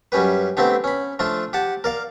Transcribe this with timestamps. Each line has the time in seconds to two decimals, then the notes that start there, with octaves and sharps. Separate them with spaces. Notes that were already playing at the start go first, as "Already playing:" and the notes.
0.12 F#2 G3 C#4 G4 B4
0.57 A3 B3 C4 D4 G4
0.84 C#4 B5
1.19 F3 A3 D4 F4
1.53 G4 F#5 A5
1.84 A#4 D5 F5